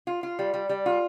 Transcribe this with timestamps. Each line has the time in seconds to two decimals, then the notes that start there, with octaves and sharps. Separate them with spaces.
0.07 F4
0.23 F4
0.39 G3
0.54 G3
0.69 G3
0.86 F4